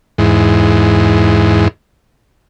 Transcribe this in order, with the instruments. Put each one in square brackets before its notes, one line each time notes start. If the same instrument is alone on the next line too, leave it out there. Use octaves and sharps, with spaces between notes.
[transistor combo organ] E2 G#2